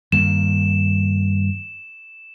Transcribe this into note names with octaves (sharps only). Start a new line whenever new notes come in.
G2 D#3 A#3 E7